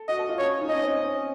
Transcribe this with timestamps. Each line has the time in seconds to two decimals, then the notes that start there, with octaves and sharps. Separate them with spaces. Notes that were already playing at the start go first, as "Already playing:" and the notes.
Already playing: A4
0.08 F#4 D#5
0.19 A4
0.29 F4
0.38 C#4 C#5
0.61 D#4
0.68 C#4 D#5
0.83 C4
0.99 C#4